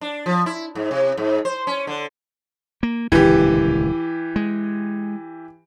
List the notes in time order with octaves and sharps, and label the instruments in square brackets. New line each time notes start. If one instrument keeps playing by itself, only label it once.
[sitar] D4
F3
E4
G#2
C3
G#2
C5
C#4
D3
[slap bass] A#3
[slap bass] D#1 C#2 D3 [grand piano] E3 G4
[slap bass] G#3